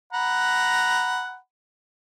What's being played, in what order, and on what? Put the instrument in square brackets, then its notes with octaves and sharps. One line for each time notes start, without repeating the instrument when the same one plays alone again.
[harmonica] F#5 A#5 B5